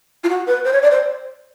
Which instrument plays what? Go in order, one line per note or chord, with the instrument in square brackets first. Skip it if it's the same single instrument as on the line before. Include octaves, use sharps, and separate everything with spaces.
[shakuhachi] F4
F#4
B4
C5
C#5
D5
C5